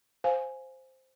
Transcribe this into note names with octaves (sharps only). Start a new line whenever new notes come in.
C5 F5 G#5